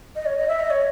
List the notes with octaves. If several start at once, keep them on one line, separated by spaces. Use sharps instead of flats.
D#5
C#5
D#5
E5
D#5
C#5